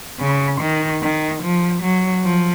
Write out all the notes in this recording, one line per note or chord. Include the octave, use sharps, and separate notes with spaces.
C#3
D#3
D#3
F3
F#3
F3